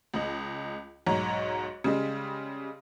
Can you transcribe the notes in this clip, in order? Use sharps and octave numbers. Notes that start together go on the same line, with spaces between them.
C#2 D#5 F#7
B1 G#2 C#5 A#5
C#3 G3 G#3